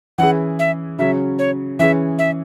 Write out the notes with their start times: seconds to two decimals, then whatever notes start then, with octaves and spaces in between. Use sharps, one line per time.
0.18 E3 C#4 E4 G#4 F#5
0.59 E5
0.99 C#3 F#3 C#4 E5
1.39 C#5
1.79 E3 C#4 G#4 E5
2.19 E5